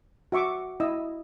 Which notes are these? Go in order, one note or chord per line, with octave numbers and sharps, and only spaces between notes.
F#4 E5 C#6 D6
E4 D#5 E6